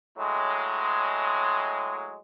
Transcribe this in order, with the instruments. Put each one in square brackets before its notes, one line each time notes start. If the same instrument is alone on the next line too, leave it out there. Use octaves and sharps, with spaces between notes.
[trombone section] A2 F#3 G#3